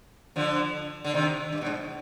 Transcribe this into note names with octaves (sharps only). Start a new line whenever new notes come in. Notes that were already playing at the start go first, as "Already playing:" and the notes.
D3 F3
D3
C3 D#3
G2
B2
G#2